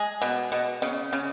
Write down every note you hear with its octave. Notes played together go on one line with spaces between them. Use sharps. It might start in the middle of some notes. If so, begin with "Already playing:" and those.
Already playing: G#3 G#4
B2
B2
C#3
C#3